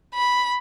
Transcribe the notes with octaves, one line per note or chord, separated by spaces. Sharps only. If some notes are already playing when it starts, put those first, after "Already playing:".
B5